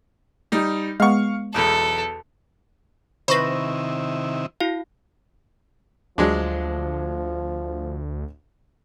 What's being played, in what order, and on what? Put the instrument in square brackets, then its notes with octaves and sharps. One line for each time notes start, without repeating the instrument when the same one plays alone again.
[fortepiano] G3 D#4
[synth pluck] G#3 B3 [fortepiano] F5 C#6
[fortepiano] B1 E2 [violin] A4
[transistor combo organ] C3 D#3 E4 [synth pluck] B4 C5 [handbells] B5 C#6 A#6
[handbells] E4 F#4 F5
[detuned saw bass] D2 [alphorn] F3 [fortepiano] F#3 G#3 D4